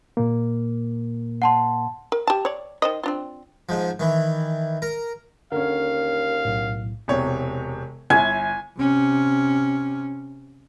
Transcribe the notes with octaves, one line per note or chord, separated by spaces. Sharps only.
A#2 A#3
F#5 A5 C6
A#4
G4 A5
C#5 D5
D#3 C5 D#5
C4 D4 F4
G#2 F3
D#3 E3
A#4
D#2 D3 C#4 A#4 F5
B1 A2
E1 C3 C#5
G1 E4 G#5
C3 C#4